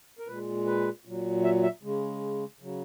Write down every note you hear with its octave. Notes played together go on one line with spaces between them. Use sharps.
A#4
A#2 G#3 B4
B4
A#2 F#3
E5
E5
C#3 G#3
C#3 F#3